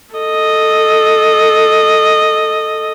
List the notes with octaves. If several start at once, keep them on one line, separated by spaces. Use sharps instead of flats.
A4 D#5